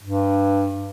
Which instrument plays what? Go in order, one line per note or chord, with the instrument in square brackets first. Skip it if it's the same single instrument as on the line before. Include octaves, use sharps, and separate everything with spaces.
[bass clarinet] G2